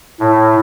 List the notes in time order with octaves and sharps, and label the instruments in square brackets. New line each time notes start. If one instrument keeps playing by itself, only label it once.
[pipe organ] A2